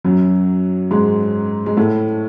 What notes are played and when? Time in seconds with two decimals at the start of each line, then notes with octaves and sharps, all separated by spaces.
0.04 F#2 F#3
0.91 G#2 G#3
1.66 G#3
1.77 A2 A3